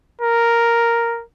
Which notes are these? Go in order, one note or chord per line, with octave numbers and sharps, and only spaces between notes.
A#4